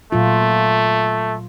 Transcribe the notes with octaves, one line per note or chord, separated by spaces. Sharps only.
A#2 F#3 A3 F4